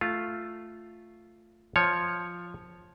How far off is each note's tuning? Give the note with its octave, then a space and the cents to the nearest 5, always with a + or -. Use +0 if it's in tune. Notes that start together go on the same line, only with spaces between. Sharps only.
A3 +0 F4 +0
F3 +0 C#5 +0